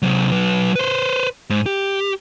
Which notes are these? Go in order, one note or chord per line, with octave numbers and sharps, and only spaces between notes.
C3 F#3
F#3 B4
B4 C5
G#2
G4